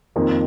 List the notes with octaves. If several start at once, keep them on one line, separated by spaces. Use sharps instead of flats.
F2 D#3 A#3